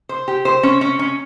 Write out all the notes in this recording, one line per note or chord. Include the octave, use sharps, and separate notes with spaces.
C5
G4
C5
C#4
C#4
C#4